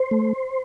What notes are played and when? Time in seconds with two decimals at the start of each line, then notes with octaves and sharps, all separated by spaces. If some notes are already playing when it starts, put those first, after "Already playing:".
Already playing: C5
0.11 A3